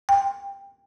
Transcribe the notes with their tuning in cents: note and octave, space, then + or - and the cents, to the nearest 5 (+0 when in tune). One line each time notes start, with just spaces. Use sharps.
G5 +15